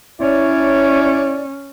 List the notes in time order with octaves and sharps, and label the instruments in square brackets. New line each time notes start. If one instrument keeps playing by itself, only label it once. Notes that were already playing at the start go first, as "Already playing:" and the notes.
[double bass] C#4 [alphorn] E4 [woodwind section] C#5 D5